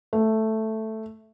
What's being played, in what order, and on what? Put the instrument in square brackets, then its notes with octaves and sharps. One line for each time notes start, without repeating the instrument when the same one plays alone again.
[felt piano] A3